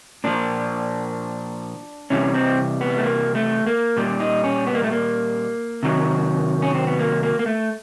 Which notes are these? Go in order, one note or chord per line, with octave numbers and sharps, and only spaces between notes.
A#2 F3 D4
C3 E3 G3 C#4
C4
B3
A3
A#3
A3
A#3
A#2 G3
D#4
C#4
B3
A#3
A3
A#3
C3 D#3 F#3
C#4
C4
B3
A#3
A#3
A#3
A3